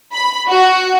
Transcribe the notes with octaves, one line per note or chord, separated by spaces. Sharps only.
B5
F#4